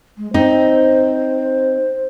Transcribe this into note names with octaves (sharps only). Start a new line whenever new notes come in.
G#3
C4 D#4 C5